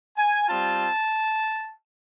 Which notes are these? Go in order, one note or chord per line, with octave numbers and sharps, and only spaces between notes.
G#5
G3 C4 F4 A5